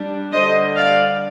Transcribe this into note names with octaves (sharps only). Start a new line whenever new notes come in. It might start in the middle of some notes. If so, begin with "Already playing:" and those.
Already playing: G3 D4
D3 G3 D4 C5 D#5
D5 F5